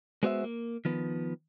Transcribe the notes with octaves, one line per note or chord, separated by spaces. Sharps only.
G#3 B3 F#4 C5 D#5 E5
A#3
D#3 F3 B3